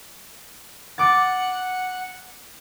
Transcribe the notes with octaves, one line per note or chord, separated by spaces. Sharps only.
F#5 D6 A6